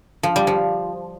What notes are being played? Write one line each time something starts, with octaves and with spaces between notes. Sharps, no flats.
F3
G3
F3